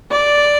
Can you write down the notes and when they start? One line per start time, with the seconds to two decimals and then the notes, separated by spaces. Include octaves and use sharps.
0.12 D5